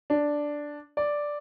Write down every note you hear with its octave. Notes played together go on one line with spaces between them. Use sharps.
D4
D5